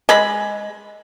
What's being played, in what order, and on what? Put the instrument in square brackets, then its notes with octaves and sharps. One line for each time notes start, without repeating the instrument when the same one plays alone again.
[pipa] G#3 B5